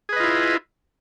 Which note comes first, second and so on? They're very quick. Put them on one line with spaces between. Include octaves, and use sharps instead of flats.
G#4 B4 D#5 F4 E4